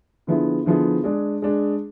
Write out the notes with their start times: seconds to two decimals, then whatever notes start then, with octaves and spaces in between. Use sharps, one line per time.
0.27 D3 F3 B3 E4 G#4
0.66 D3 F3 B3 E4 G#4
1.04 G#3 D4 G#4
1.42 G#3 D4 G#4